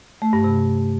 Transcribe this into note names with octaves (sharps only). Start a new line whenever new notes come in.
A3
G2
C3